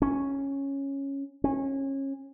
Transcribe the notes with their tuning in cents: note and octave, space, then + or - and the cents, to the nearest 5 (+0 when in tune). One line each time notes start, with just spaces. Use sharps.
C#4 -5
C#4 -25